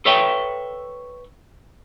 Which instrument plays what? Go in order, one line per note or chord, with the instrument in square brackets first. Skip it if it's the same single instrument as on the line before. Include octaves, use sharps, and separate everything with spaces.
[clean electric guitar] A4 B4 C#5 E5 G5